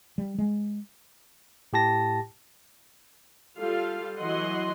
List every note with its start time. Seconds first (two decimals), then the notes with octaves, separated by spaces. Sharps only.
0.18 G3
0.38 G#3
1.73 A2 G4 A5 A#6
3.58 G3 F4 A4 F5
4.19 E3 F#3 D#5 F#5 C6